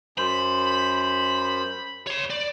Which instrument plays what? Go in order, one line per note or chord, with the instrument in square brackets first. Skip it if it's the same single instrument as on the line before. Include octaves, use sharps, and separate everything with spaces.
[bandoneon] F#2 C5 [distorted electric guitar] B5
[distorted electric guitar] C#5 C6
D5